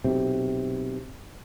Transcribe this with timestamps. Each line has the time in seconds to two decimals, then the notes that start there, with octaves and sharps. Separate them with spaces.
0.04 B1 C3